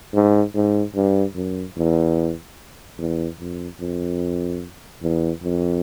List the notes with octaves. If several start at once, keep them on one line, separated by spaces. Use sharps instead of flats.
G#2
G#2
G2
F#2
E2
E2
F2
F2
E2
F2